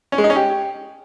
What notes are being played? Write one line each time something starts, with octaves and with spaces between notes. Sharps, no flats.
C#4
G#3
D#4
C#4
G4